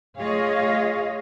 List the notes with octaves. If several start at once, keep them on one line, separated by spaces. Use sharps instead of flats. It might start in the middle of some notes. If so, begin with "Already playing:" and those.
A3 F4 G#4 C#5 D#5 F5